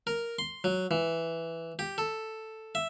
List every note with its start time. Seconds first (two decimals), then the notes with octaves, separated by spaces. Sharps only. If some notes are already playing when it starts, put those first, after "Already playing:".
0.07 A#4
0.39 C6
0.64 F#3
0.91 E3
1.79 G4
1.98 A4
2.75 E5